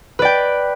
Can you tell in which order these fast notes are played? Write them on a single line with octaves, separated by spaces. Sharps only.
B4 D5 G5